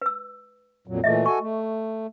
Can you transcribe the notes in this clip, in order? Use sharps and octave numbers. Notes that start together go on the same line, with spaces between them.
B4 E6
F2 A#2 F#3
A#2 E3 A3 G#4 D#5 E5
F#4 A4 G#5 C#6
A3